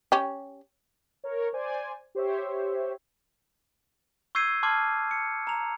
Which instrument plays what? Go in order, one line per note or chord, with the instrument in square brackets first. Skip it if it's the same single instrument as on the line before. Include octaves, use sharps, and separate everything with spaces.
[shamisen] C#4 G4
[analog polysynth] A#4 C#5
C5 D5 G#5
G4 C5 C#5 E5
[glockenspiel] C#6 E6 G6 G#6 C7 D#7
A5 C6 D6 F6 G#6 C7
C#7
A#5 F7